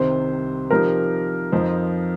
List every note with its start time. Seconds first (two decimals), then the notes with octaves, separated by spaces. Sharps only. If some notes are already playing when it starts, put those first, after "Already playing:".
Already playing: C2 C3 D#3 C5
0.71 C3 F3 D#4 G4 A#4 C5
1.52 F2 F3 D#4 C5